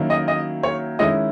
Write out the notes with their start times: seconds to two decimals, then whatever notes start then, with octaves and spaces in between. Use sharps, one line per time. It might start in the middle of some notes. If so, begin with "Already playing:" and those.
Already playing: D#3 F#3 A#3 C#4 E4
0.10 D#5
0.28 D#5
0.63 C#5
0.99 D#3 G#3 C#4 E4 D#5